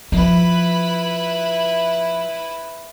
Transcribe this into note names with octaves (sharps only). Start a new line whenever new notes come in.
F3 E4 B4